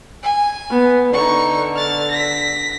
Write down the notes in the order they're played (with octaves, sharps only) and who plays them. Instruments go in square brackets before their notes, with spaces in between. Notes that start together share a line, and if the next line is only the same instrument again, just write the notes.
[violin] G#5
[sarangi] B3
[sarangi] D3 [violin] D#4 C#6
[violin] F6 A6
A#6 B6